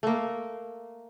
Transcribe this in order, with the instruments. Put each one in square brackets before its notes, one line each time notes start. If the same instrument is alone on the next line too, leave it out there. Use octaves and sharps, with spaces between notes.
[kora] A3 A#3